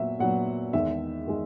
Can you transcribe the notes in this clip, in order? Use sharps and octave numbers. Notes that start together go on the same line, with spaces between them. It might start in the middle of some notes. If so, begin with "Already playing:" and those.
Already playing: A#2 F#3 B3 E5
A#2 F#3 B3 F#5
E2 D#3 G#3 E5
D#3 G#3